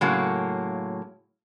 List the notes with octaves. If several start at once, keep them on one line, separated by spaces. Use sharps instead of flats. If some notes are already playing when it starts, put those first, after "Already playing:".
A2 C#3 F#3 G#3 A#3